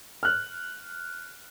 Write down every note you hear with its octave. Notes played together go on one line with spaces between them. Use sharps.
F6 F#6